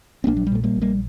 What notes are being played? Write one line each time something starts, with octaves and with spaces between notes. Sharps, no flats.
C4
A#1 A#3 D4
F#3
G3
A#2 A3
G3 A#3
A#1
G3 A#3